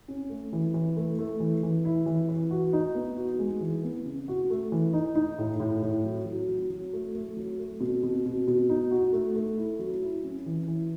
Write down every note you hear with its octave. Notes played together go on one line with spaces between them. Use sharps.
C#4
A3
E3
E3
A3
A3
E3
E3
E4
E3
E3
F#4
D#4
B3
F#4
G#3
E3
B3
C#3
F#4
A3
E3
D#4
D#4
A2
A2
A2
F#3
F#3
F#3
F#3
A3
A3
F#3
A3
B2
B2
B2
B2
D#4
F#4
A3
A3
E4
F#3
E4
C#4
E3
E3